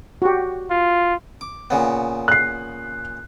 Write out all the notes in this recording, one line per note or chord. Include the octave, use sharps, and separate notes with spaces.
F#4 G4
F4
D6
A#2 C#3 B3
F#6 C7